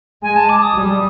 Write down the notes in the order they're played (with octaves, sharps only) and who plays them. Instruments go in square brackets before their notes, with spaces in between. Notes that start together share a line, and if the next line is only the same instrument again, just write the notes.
[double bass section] G#3 [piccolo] G#5
[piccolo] A5
D6
D#6
[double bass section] G3